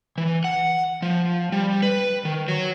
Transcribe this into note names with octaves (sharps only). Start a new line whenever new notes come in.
E3
F#5
F3
G3
B4
D#3
F#3